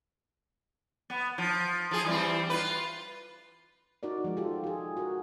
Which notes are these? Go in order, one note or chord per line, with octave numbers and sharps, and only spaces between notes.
B3
F3
F3 G#4
E3 G3 C4
F4 B4
D#4 F#4 A#4 D5
F3 G#3
F4 G4 A4
F4 G#4
F#4 A#4